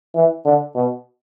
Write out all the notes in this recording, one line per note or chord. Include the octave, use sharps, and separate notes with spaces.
E3
D3
B2